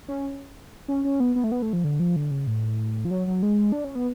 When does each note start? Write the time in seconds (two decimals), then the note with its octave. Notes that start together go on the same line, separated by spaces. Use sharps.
0.08 C#4
0.88 C#4
1.04 C#4
1.20 B3
1.36 B3
1.44 A3
1.52 B3
1.62 A3
1.73 F3
1.84 D3
2.00 F3
2.16 D3
2.31 C#3
2.47 A2
3.05 F3
3.11 F#3
3.27 F#3
3.43 G#3
3.72 D4
3.84 C#4
3.95 B3